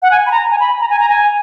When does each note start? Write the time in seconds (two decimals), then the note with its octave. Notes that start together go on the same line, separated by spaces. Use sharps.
0.02 F#5
0.11 G#5
0.26 B5
0.31 A#5
0.51 G#5
0.60 B5
0.81 A#5
0.90 G#5
1.00 A#5
1.09 G#5